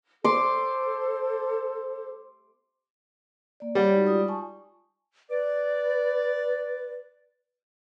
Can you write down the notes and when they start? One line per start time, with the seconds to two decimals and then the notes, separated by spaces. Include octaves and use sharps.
0.24 A4 C5 C6 D6
3.60 A#3 D5
3.75 G3 C#5 D5 F#5
3.94 G#3 D#4 F#4
4.07 F4 D5 D#6
4.28 G#5 A5 C#6
5.30 B4 D5